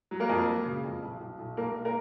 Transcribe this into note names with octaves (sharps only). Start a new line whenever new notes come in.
F#3
A#3 A#4
F2
F#3
C#3
F2
B1
B1
B1
B1 A#3 A#4
A#3 A#4